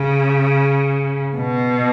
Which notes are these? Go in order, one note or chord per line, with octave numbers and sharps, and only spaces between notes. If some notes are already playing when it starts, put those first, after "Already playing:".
Already playing: C#3
B2